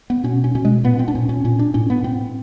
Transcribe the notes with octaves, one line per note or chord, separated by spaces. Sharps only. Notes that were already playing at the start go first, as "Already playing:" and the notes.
B3
B2 C#4
C#4
B2 C#4
G#3
A#2 B3
C4
D4
A#2 C#4
C#4
A#2 C#4
D4
A2 C#4
B3
A2 C4